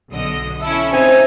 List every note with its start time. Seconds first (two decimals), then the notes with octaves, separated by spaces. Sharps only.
0.11 B1 D3 D#5
0.62 C#4 E4 A4 E5
0.93 C4 D#4 G#5